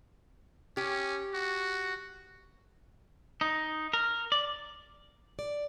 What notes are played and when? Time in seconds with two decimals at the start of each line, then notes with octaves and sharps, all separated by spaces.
0.77 C#4 G4
1.34 F#4
3.41 D#4
3.93 A#4
4.32 D5
5.39 D5